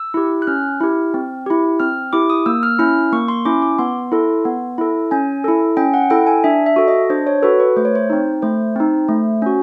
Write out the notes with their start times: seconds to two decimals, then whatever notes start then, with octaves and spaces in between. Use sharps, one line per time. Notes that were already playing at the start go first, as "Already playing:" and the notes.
Already playing: E6
0.14 E4 G4
0.42 F#6
0.47 C#4 F6
0.81 E4 G4
1.14 C4
1.46 E4 G4
1.80 C4 F6
2.13 E4 G4 D6
2.30 D#6
2.46 A#3 E6
2.63 F6
2.79 C#4 E4 F6
3.12 A#3 C#6
3.28 C6
3.45 C#4 E4 D6
3.62 D6
3.78 B3 C6
4.12 E4 A4
4.45 B3
4.78 E4 A4
5.11 C#4 G#5
5.44 E4 A4
5.77 C#4 G5
5.94 F#5
6.10 E4 A4 G5
6.27 G#5
6.44 D4 E5
6.66 E5
6.76 F#4 A4
6.88 D#5
7.10 D4 C5
7.27 C#5
7.43 F#4 A4 B4
7.60 B4
7.76 A3 C5
7.85 C#5
7.95 C5
8.10 C4 D#4
8.42 A3 C5
8.76 C4 D#4
9.08 A3
9.42 C#4 F#4